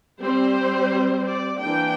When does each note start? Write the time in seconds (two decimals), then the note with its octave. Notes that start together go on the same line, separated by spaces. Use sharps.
0.21 G3 C4 C5
1.26 D5
1.61 E3 A#3 D4 G5